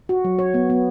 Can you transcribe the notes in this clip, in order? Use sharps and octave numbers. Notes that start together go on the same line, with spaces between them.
F#4
F#3
C#5
B3
B3